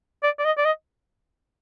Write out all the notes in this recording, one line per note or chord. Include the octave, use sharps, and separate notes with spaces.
D5
D5
D#5
D5
D#5